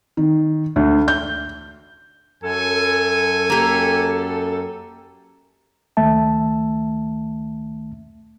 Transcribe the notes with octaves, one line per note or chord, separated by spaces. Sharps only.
D#3
D2
G6
F#2 A4 G#5
A#3 G4
C#2 D#3 A3 E5 A5